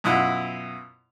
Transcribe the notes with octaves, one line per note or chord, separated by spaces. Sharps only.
F#2 B2 E4 F4 F#5